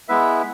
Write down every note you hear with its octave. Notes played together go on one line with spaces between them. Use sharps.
G#3 B3 E4 B4 E5